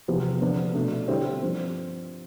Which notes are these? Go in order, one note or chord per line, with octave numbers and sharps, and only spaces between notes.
E2 C3 F3 B3
D3 F3 B3 D4
B2 A3 D4
D3 G3 C4 E4
G2 F3 C4